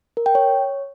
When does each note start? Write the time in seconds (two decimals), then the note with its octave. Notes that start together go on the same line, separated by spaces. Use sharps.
0.17 A#4
0.26 G5
0.35 C#5